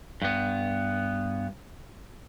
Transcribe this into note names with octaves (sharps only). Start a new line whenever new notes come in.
G2 B3